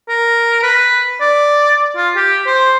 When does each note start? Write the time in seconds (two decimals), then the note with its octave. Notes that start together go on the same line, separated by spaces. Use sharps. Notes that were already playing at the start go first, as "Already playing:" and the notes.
0.08 A#4
0.63 B4
1.21 D5
1.96 F4
2.16 G4
2.46 C5